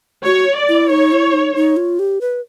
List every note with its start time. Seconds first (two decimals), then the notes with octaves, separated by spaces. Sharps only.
0.25 F#4 C#5
0.58 D5
0.69 E4
0.90 D#4 C#5
1.12 E4
1.33 D#4
1.55 D#4
1.77 F4
1.99 G4
2.21 B4